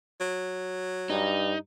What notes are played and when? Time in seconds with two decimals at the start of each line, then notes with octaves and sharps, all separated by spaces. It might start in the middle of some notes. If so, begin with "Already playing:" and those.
0.21 F#3
1.10 G2 D#4